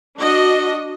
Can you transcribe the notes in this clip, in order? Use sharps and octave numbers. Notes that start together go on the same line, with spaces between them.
D4 F#4 D#5